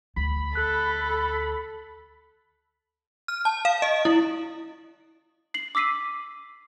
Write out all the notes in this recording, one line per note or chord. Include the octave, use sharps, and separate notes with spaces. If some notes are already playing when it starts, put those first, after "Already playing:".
D2 B5
A4 F#6
F6
A5
F5
D#5
E4
C7 F#7
D6 E6 B6 C7 D#7